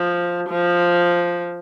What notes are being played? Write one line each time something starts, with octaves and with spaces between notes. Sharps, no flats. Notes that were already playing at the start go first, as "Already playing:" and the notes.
Already playing: F3
F3